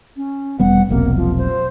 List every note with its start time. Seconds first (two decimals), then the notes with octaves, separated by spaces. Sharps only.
0.16 C#4
0.60 E1 G3 B3 F#5
0.89 E1 B1 C3 A#3
1.16 F3
1.37 C5